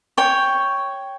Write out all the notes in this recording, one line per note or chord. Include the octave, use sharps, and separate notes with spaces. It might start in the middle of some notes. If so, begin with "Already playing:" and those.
C#5 G5 C#6